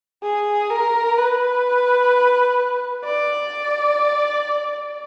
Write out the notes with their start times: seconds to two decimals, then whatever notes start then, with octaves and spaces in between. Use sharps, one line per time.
0.23 G#4
0.70 A#4
1.18 B4
3.05 D5